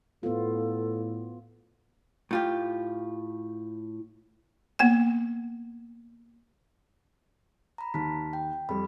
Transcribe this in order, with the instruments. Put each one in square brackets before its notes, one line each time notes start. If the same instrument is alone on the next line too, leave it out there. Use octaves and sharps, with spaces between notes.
[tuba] A2 [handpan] B3 F4 [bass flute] A4
[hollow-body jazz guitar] A2 F4 G4
[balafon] A#3 B3 F#5
[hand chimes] A#5 B5
[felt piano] D#2 [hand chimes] A5 F6 B6
[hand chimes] G5
[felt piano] F2 G3 [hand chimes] B5